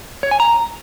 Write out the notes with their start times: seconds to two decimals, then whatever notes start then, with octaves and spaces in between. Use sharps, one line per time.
0.23 C#5
0.31 G#5
0.40 A#5